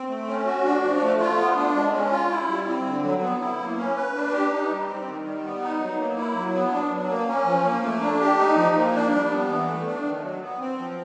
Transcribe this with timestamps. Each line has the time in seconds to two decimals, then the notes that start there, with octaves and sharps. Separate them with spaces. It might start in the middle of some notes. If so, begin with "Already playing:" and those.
Already playing: C4
0.08 A3
0.28 C#4
0.46 F#4
0.64 D4
0.82 F3
1.01 A3
1.20 F4
1.38 B3
1.56 D4
1.75 G#3
1.93 C#4
2.12 F4
2.30 E4
2.48 G3
2.67 C4
2.86 D3
3.04 F#3
3.22 B3
3.41 E4
3.59 A#3
3.78 C#4
3.96 B4
4.15 D4
4.32 G4
4.51 D#4
4.70 G3
4.88 C4
5.07 D#3
5.25 G3
5.44 B3
5.62 D#4
5.80 F#3
5.98 A#3
6.17 E4
6.36 F#3
6.54 B3
6.72 D4
6.91 F#3
7.09 A#3
7.28 C#4
7.46 F3
7.64 A#3
7.83 A3
8.01 D4
8.21 G4
8.39 D#4
8.57 F3
8.75 A#3
8.94 D4
9.13 G3
9.31 B3
9.49 E3
9.68 A3
9.86 D4
10.05 D#3
10.22 F#3
10.41 B3
10.59 C4
10.79 F3